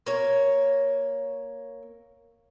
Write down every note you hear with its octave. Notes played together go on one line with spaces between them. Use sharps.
A#3 C#5